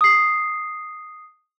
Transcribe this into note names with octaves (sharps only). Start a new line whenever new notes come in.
D#6 C7